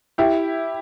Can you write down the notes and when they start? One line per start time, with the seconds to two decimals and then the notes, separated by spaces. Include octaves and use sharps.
0.18 E4 G4